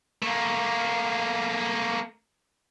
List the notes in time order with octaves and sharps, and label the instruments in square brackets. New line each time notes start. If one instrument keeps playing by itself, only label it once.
[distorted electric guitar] A3 A#3